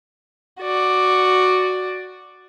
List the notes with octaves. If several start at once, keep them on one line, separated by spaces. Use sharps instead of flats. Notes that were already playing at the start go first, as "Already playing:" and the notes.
F#4 D5